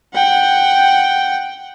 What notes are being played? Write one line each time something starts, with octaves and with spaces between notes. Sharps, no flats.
F#5 G5